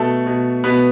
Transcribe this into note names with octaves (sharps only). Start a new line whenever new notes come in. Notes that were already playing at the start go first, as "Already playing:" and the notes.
Already playing: B2 A3 A4
B2
B2 B3 B4